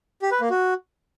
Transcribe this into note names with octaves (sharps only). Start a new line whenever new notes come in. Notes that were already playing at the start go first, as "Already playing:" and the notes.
G4
B4
A#3
F#4